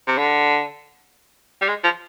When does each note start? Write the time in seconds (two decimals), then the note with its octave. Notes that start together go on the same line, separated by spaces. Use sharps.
0.07 C3
0.18 D3
1.61 G3
1.68 G#3
1.84 F3